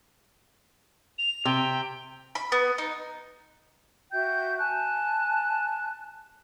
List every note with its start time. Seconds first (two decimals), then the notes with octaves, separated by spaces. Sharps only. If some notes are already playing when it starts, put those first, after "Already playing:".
1.18 F7
1.45 C3 G5
2.35 B5
2.52 B3
2.78 D#4
4.12 F#4 E5 G5 G6
4.59 G#5 A5 F#6